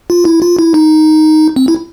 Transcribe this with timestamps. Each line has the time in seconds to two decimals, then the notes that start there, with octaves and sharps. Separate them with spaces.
0.10 F4
0.25 E4
0.42 F4
0.59 E4
0.74 D#4
1.56 C4
1.68 E4